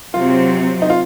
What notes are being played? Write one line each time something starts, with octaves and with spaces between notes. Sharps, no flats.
C3 F#3 C4 F4
D#4
F4